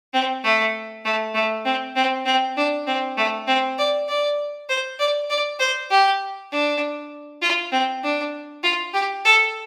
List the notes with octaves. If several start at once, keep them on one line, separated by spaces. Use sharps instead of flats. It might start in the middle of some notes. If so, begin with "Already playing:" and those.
C4
A3
A3
A3
C4
C4
C4
D4
C4
A3
C4
D5
D5
C5
D5
D5
C5
G4
D4
F4
C4
D4
F4
G4
A4